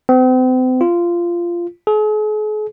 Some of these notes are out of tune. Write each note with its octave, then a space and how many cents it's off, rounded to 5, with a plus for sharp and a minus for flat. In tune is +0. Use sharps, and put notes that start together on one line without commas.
C4 -40
F4 -15
G#4 +45